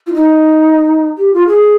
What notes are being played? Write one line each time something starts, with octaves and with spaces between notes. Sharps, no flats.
F4
D#4
G4
F4
G#4